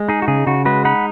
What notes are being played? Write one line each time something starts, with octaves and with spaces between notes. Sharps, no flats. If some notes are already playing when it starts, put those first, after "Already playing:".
Already playing: G#3
D#4 G#4
F#4
C#3 G#4
C#3 F#4
G#3 F#4 B4
D#4 F#5 B5